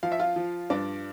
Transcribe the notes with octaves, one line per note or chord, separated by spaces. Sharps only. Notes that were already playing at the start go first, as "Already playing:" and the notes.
F3 F5
E5
F4 F5
F3
G2 D4 D5